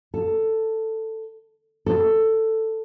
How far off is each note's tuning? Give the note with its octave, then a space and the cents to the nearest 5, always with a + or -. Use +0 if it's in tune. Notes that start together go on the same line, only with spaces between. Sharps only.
A4 +10
A4 +10